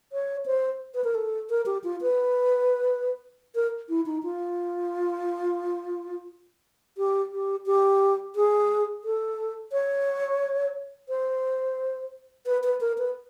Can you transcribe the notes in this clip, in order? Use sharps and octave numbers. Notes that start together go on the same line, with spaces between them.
C#5
C5
B4
A#4
A4
A#4
G4
F4
B4
A#4
E4
D#4
F4
G4
G4
G4
G#4
A4
C#5
C5
B4
B4
A#4
B4